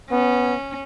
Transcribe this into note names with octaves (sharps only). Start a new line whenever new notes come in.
B3 C#4